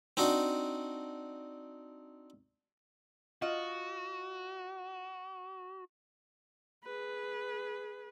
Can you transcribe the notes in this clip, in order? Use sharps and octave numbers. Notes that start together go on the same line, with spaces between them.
C4 D4 D#4 F#4
F4 F#4 D#5
G#4 B4